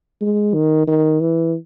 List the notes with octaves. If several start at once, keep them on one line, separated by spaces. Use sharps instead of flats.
G#3
D#3
D#3
E3